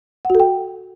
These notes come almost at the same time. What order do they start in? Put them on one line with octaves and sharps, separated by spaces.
F#5 F#4 A4 G5